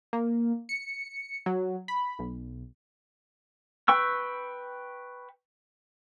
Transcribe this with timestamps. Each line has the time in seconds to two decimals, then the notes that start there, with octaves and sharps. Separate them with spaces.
0.13 A#3
0.69 C#7
1.46 F#3
1.88 B5
2.19 B1
3.88 B4 G5 C#6 E6